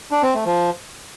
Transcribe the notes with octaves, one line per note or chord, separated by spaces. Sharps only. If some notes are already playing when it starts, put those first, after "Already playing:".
D4
C4
A3
F3